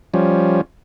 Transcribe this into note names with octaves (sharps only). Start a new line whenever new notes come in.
F3 G3 C#4